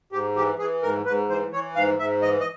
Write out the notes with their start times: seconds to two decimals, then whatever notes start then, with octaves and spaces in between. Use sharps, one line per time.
0.12 G#2 G4
0.36 E3 G4
0.58 E3 G#4
0.82 G#2 A#4
1.06 G#2 B4
1.29 E3 C5
1.52 E3 C#5
1.75 G#2 F5
1.99 G#2 E5
2.22 E3 D#5
2.40 D#5